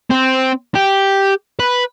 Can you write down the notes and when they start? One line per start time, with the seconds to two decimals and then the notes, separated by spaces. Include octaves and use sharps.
0.11 C4
0.76 G4
1.59 B4